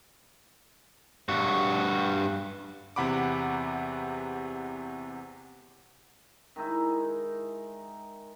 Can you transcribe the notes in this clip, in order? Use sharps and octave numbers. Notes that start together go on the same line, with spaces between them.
G2 F#4
E2 C3 F#5 B5 D6
D#3 G#3 D#4 E4